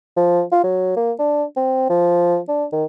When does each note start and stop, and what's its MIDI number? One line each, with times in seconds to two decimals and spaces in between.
0.17 0.42 53
0.52 0.63 65
0.64 0.95 54
0.96 1.12 58
1.19 1.44 62
1.56 1.85 60
1.89 2.38 53
2.48 2.65 62
2.72 2.84 51